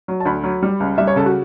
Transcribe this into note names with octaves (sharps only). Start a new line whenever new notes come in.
F#3
A5
D2 B5
F#3
G3
C#2
G3 E5
C#5
C#3 A4
F#4